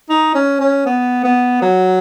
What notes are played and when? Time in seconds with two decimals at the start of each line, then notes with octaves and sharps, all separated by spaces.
0.10 D#4
0.35 C#4
0.60 C#4
0.86 B3
1.24 B3
1.62 F#3